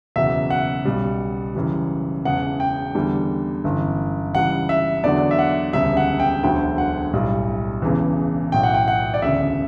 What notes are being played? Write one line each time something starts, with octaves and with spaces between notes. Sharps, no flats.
F#1 E2 B2 F#3 E5
F#5
B1 B2 G3
F#1 F#2 E3 G3
E1 E2 C#3 F#5
G5
E2 D3 G3
G1 F#2 E3
C#2 C#3 E3 G3 F#5
E5
E2 D3 F#3 D5
E5
F#5
E1 D2 C#3 G3 E5
F#5
G5
E1 D2 D3 F#3 G5
F#5
B1 A2 G3
E1 E2 C#3 E3
B1 A2 F#3 G5
F#5
G5
F#5
D5
E1 D2 C#3 E5